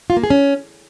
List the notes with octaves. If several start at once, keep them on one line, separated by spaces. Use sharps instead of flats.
F4
A#3
G#4
C#4